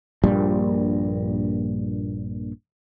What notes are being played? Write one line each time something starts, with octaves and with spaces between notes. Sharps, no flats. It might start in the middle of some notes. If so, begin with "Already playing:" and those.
A#1 G2 A#2 G3